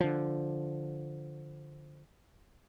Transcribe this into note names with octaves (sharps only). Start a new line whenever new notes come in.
D3 F3